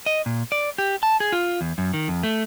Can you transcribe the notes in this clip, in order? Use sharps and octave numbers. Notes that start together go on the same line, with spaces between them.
D#5
A#2
D5
G4
A5
G#4
F4
E2
F#2
D#3
F2
A3